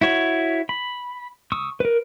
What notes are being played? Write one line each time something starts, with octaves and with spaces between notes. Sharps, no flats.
E4 F#4 C#5
B5
C#6 D#6 E6
A#4 B4